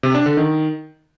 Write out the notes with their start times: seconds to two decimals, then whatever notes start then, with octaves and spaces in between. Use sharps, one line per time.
0.03 C3
0.15 D4
0.26 D3
0.37 D#3